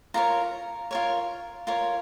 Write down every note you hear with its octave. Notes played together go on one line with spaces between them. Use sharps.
F4 A#4 C#5 A#5
F4 A#4 C#5
F4 A#4 C#5